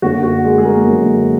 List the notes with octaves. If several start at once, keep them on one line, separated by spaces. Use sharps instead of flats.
F#2 D3 F#3 A#3 F#4
F#4
G#3 G#4
G#4
A#3 A#4
F#2 D3 F#3 A#3